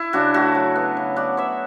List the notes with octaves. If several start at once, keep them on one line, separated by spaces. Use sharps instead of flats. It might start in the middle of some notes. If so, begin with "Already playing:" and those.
Already playing: E4
C#3 D4 F#4
A3 F#4 A4
F#3
B3
C#3
B3 D5 F#5
B3 C#5 E5